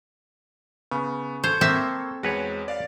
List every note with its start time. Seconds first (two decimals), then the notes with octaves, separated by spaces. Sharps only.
0.91 C#3 B3
1.44 A4 C5 C#6 G#6
1.61 A#3 C4 E5
2.23 E2 G#3 F#4 B4 C#5
2.68 D5 F5 A6